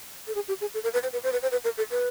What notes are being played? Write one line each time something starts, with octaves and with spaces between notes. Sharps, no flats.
A4
G#4
G4
G#4
A4
A#4
B4
C5
B4
C5
B4
C5
B4
A#4
A4
B4